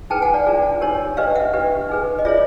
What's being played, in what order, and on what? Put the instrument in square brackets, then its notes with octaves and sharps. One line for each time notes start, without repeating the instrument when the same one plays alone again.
[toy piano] D#4 G#4 B4 G5 A5
F#5 G#5
D5
D4 F4 G#4
D#4 G4 A#4 C#5
D4 G4 B4 D#5 F5
E5 F#5
D4 G4 B4
D#4 G#4 B4
D#5
F4 G#4 C#5 D5 E5